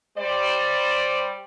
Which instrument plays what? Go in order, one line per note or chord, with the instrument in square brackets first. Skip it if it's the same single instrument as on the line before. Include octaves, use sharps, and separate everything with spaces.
[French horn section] G3 C5 D5